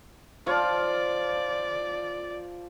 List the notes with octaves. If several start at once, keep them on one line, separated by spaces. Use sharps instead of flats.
F3 F4 D5